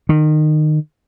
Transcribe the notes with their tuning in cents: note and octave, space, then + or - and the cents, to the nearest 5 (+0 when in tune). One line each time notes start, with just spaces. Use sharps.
D#3 -25